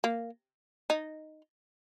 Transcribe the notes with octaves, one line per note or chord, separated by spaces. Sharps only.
A#3
D#4